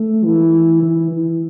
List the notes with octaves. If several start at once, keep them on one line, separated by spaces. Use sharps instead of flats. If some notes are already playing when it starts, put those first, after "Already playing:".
Already playing: A3
E3
E3
E3